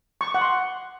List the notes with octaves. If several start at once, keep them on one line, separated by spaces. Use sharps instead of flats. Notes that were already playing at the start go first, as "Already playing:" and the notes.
C#6
D6
F#5
C6